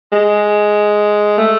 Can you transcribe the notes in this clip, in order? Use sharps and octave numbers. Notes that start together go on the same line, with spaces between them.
G#3
A3